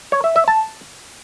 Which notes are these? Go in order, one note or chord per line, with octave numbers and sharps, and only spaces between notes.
C#5
E5
E5
A5